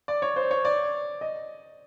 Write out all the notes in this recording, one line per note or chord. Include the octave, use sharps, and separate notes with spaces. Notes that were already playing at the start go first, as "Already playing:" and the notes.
D5
C#5
C5
C#5
D5
D#5